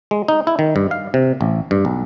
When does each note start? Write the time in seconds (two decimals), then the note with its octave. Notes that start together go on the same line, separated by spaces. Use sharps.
0.11 G#3
0.28 D#4
0.47 E4
0.59 D#3
0.76 G2
0.91 F5
1.14 C3
1.41 A1
1.71 G2
1.85 B1